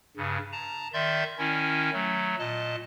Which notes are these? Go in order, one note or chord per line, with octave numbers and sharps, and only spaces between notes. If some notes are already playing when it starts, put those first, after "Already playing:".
G2 C#3
A5 A#5
D#3 D5 E5 C6 G6
D#3 C#4 E4
F#3 A3
A#2 D#5 A5